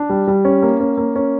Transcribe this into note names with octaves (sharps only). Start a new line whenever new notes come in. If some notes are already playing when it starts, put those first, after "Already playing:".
Already playing: D4
G3
G3
C#4
A#3
C#4
A#3
C#4